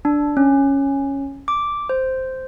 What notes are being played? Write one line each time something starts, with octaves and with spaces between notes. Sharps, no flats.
D4
C#4
D6
C5